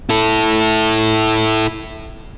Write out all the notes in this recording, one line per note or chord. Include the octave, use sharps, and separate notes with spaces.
E4 A4